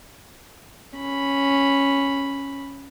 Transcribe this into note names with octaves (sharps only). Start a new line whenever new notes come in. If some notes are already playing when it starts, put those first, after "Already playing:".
C#4 B5